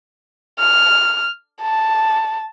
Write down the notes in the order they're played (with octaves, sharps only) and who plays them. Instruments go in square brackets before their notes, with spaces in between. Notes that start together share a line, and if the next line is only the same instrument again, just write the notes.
[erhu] F6
A5